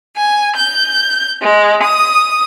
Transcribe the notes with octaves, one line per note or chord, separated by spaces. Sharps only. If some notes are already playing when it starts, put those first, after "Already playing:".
G#5
G6
G#3
D#6